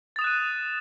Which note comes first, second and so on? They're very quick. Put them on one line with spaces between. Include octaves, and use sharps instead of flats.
A6 D#6 E7 F#6 D#7